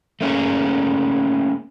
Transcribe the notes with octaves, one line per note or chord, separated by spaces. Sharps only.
A3 A#3 C#4 G#4